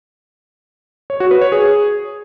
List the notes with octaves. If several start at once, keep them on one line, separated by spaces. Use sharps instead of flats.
C#5
F#4
B4
C#5
G#4